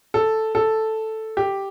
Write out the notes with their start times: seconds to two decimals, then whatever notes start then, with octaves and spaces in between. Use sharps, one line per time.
0.14 A4
0.55 A4
1.37 G4